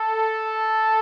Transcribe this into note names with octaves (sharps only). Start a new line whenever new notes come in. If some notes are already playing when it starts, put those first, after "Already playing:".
Already playing: A4